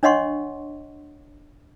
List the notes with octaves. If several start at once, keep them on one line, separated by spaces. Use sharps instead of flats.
D4 C#5 D#5 F#5 C6 C#6